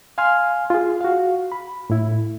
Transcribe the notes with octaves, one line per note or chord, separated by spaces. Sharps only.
F5 G#5 C6 F6
F4 G#4
F#4 F5
B5
A2 E4